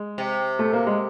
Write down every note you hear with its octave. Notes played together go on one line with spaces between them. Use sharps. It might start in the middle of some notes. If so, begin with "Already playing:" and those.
Already playing: G#3
C3
A3
A#3
G#3